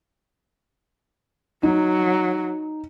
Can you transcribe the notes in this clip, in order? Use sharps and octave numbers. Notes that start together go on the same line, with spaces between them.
F#3 D#4